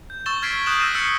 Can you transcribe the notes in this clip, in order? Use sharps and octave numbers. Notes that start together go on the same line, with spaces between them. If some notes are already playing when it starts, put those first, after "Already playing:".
G6
C#6 E6 A6 E7 G7
F6 G#6 A6 B6 C7 D7
D#6 F#6 G6 E7 F#7
E6 F6 A6 A#6 D#7 E7
E6 F6 G6 A6 C7 C#7